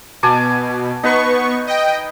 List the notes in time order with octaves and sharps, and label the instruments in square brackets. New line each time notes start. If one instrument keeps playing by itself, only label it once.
[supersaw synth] B2 [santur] G#5 A5 D6
[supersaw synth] B3 C#6 [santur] D#4 B4
[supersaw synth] D#5 G5